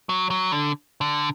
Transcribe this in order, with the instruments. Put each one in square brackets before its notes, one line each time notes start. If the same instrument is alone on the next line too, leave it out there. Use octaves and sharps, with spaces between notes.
[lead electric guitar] F#3
F#3
D3
D3